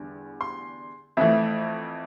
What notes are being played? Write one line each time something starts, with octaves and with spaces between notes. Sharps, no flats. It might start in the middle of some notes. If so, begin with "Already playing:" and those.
Already playing: E2 D3 G3
C6
F2 E3 A3 E5